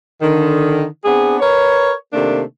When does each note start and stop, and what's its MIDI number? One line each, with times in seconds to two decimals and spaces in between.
0.21 0.83 50
0.21 0.83 51
1.05 1.36 59
1.05 1.36 60
1.05 1.36 62
1.05 1.36 68
1.40 1.92 70
1.40 1.92 71
1.40 1.92 73
2.13 2.41 48
2.13 2.41 51
2.13 2.41 57
2.13 2.41 58
2.13 2.41 62